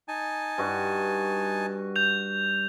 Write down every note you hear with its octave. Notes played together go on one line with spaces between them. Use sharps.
D#4 G#5 A5
G2 F#4
G6 F7